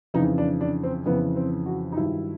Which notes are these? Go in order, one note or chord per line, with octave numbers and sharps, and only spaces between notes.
F2 C#3 E3 D#4
D4
D4
C4
F2 C#3 E3 B3
C4
F#4
D#4
G2 D#3 F#3 E4